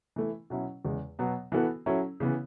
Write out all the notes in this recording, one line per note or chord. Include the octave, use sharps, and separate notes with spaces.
E3 A3 E4
B2 F#3 C#4 E4
E2 C#3 G#3
B2 F#3 B3
E3 B3 F#4 A4
F#3 C#4 E4 A4 C#5
C#3 E3 B3